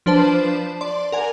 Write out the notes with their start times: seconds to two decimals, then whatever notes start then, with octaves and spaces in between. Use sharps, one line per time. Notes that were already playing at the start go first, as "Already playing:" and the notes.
0.06 F3 D4 B4 C5 A5
0.81 D5 C6
1.12 A#4 F#5 G#5